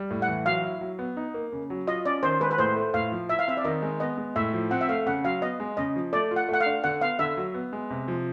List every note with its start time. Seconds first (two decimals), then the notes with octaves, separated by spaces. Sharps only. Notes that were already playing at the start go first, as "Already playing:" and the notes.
Already playing: G3
0.11 A2
0.22 F#5
0.28 E3
0.46 F#3 F5
0.64 E4
0.81 F#3
0.99 B3
1.17 D#4
1.34 A#3
1.52 C#3
1.70 F#3
1.87 F4 D#5
2.05 C#4 D5
2.23 D#3 C5
2.40 G#3 B4
2.51 B4
2.58 A2 C5
2.76 A3
2.94 A2 F5
3.12 F3
3.29 E4 E5
3.39 F5
3.47 C4 E5
3.57 D5
3.64 D#3 D#5
3.82 G#3
4.00 B3 D#5
4.18 G#3
4.36 A2 E5
4.53 F3
4.71 C4 F#5
4.81 E5
4.89 A3 F5
5.06 C#3 F#5
5.24 F#3 F5
5.42 B3 D#5
5.60 G#3
5.77 C#3 D#5
5.96 F3
6.13 A3 D5
6.31 F4
6.36 F#5
6.49 A3 F#5
6.61 F5
6.66 D4
6.84 D3 F#5
7.01 B3 F5
7.19 D3 E5
7.37 F#3
7.54 B3
7.73 G#3
7.90 C3
8.08 F3